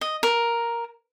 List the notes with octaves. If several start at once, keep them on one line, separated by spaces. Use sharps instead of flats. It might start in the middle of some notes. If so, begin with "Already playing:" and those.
D#5
A#4